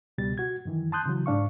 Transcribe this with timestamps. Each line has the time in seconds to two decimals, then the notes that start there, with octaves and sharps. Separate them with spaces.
0.18 C#2 B2 G3 A6
0.38 F#4 G#6
0.65 F#2 D#3 E3
0.92 A5 C6 D#6 F#6 G6
1.06 C#3 E3 F#3
1.26 G#2 D4 F5 C#6